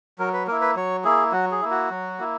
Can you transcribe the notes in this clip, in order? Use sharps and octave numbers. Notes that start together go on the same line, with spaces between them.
F#3 A#4
B4
A#3 E4 A#4
B4
F#3 C#5
A#3 E4 G#4
F#3 F#4
G#4
A#3 E4
F#4
F#3
A#3 E4